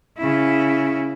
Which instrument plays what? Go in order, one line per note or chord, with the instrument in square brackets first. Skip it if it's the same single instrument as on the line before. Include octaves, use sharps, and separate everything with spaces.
[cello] C#3 E4